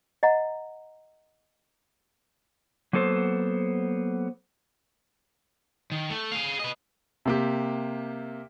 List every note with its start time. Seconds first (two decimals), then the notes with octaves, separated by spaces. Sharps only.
0.23 D#5 F#5 A#5
2.93 F#3 A#3 B3 A4 C5
5.92 D#3
6.10 A3
6.32 G#4 F5
6.60 B4 D#5
7.25 C3 A#3 G4